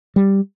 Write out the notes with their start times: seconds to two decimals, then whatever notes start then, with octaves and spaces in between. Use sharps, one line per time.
0.16 G3